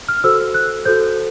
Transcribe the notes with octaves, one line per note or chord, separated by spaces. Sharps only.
F6
F#4 A4 C5 E6
F#6
F#4 A4 C5 G6